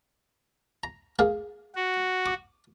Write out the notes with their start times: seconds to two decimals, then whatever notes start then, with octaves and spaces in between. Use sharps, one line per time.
0.84 A#5
1.19 A#3 G#4 F5
1.75 F#4
2.26 D6